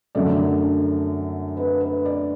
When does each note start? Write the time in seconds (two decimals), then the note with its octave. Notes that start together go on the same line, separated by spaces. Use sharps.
0.15 F#2 D3 F#3 A3 D5
1.57 B4
1.81 B4
2.05 D5